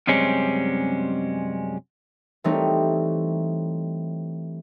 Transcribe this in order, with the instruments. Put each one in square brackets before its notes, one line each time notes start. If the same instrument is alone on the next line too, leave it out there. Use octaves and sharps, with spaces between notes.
[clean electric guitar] F#2 C3 G3 G#3 C4 C#4
[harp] E3 G3 A3 C4 D#4 C#5